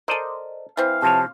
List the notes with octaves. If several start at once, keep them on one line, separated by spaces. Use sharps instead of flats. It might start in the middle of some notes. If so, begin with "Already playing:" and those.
A4 A#4 C5 D5 D#5
E3 C4 F5
C3 F3 C#5 A5